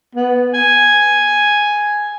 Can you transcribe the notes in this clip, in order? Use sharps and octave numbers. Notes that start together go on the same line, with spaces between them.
B3
G#5